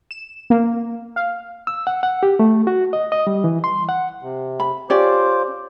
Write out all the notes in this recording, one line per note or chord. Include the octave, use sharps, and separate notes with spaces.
E7
A#3
F5
E6
F#5
F#5
G4
A3
F#4
D#5
D#5
G3
E3
C6
F#5
C3
B5
C#4 F4 G4 C5 D5 D6